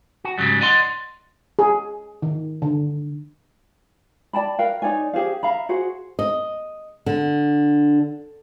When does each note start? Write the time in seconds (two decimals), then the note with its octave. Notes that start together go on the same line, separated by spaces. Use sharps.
0.25 F#4
0.38 G#2 C#3 F#3 G3
0.61 D5 D#5 F#5 C6
1.59 G#4
2.22 D#3
2.62 D3
4.33 D5 G5 A5 B5
4.59 A#4 B4 F5 G5
4.82 D#4 C#5 D5 G#5
5.14 G4 G#4 C5 F5
5.43 E5 F5 A#5 B5
5.69 F#4 G#4 C5 F#5
6.19 D#5
7.06 D3